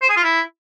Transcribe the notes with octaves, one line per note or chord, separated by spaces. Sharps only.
C5
G#4
F4
E4